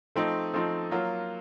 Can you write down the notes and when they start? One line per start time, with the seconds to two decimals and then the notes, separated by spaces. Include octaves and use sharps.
0.16 F3 A3 C4 D#4
0.54 F3 A3 C4 D#4
0.91 F#3 A#3 F4